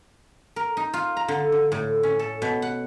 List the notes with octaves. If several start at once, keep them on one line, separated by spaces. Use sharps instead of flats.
A#4
D#4
F4
A#5
D3
D3
A2
C#4
A4
B2
F#5